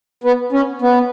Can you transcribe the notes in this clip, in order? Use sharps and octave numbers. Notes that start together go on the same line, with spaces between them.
B3
C#4
B3